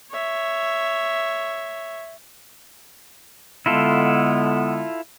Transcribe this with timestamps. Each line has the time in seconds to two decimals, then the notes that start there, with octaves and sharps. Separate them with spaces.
0.11 C#5 E5
3.66 D3 G#3 B3 E4 F4 A4